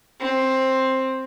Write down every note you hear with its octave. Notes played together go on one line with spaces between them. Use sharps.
C4